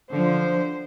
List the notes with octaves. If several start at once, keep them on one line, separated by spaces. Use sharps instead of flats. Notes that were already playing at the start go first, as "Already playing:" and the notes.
D3 F3 C5